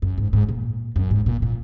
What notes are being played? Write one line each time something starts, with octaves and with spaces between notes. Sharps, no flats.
F#2
G#2
G#2
A#2
F#2
G#2
A#2
A#2